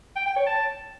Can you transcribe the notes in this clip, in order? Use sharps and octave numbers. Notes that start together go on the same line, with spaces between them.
G5
G5
C#5
A5